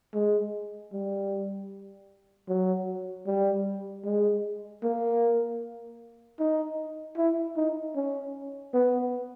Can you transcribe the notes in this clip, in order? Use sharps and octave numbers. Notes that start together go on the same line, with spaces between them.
G#3
G3
F#3
G3
G#3
A#3
D#4
E4
D#4
C#4
B3